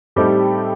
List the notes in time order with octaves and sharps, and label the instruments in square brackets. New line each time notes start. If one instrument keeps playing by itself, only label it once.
[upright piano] A2 G3 C4 D#4 A4 [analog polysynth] G4